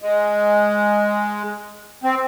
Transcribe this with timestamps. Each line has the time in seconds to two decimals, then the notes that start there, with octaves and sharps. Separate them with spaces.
0.02 G#3
2.03 C4